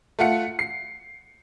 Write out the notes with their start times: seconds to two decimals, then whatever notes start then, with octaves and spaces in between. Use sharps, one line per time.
0.19 A3 F4 F#5 C#7
0.59 C7